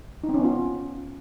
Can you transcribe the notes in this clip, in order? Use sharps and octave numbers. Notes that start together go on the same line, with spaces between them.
D#4
C4
C#4
B3
F4